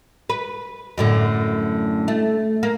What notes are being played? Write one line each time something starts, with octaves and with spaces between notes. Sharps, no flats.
B4
F#2 A2 D3
A3
A#3